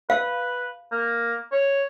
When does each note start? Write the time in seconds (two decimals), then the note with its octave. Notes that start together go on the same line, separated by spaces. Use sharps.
0.10 B4 F5
0.92 A#3
1.52 C#5